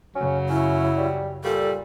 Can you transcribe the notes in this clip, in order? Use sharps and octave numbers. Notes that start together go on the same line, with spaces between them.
F#2 C#3 F#3 C#4
C#4 E4
G3
A#2 G3 A4